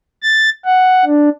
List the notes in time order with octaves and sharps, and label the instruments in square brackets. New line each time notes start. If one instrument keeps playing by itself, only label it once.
[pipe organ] A6
F#5
D4